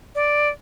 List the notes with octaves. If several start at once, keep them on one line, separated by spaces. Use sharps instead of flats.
D5